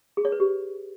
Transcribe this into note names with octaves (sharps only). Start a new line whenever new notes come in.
G#4
C#5
B4
G4